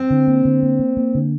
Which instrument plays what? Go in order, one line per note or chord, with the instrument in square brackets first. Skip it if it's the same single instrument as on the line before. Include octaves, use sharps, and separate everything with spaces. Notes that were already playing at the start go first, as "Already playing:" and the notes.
Already playing: [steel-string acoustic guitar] C4
[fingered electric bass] D3
A#3
D3
A#3
A#3
A#3
D3